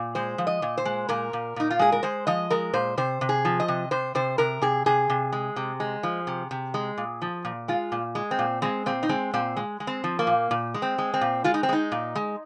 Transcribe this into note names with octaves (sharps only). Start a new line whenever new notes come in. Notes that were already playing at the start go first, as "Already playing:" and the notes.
Already playing: A#2
G#3 C5
F3
D#5
A#2
C5
G#3
A#2 A#4
A#2
A#2 D#4
F4
G#3 G#4
A#4
G#3 C5
F3 D#5
G#3 A#4
A#2 C5
C3 C5
C3
G#4
F3
D#5
C3
C3 C5
C3 C5
C3 A#4
C3 G#4
C3 G#4
C3
G#3
C3
G#3
F3
C3
C3
G#3
A#2
F3
A#2
G#3 F4
A#2
G#3
C4
A#2
G#3 C4
A#2 C4
D#4
G#3 C4
A#2 C4
G#3
G#3
C4
F3
A#3
A#2
A#2
G#3
C4
G#3
C4
A#2
G#3 F4
D#4
C4
G#3 D#4
A#2
G#3